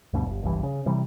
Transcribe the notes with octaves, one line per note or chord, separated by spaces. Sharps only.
D2 G2 B2
G1
G1 C#2 G2 E3
C#3
C3 E3 G3